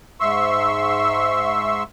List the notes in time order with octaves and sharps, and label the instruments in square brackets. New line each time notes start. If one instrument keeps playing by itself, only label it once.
[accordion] G#2 E5 C6 C#6 E6